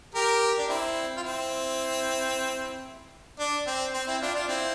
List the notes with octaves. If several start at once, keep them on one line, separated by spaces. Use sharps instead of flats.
G4 A#4
D4
C4 E4
F4
C4 E4
D4
C4
C4
C4 E4
D4 F4
D4 F4
C4 E4